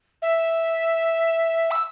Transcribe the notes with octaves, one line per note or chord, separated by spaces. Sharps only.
E5
E6